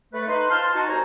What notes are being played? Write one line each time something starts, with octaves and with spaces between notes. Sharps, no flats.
A3 B4
D#4 B4 C6
F4 C5 A5 C6 F6
A5 C6
D#4 F#4 A5
C2 C5 C#5 G#5 A#5